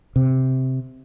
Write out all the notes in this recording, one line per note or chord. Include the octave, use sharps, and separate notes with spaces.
C3